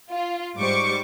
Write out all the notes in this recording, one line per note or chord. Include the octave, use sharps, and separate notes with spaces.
F4
G#2 G3 C5 C#6 D6 C#7